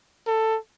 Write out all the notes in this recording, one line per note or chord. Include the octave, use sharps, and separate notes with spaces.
A4